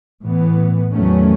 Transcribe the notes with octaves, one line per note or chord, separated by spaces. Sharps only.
A2 E3 B3
E2 D#3 F#3 A3 C#4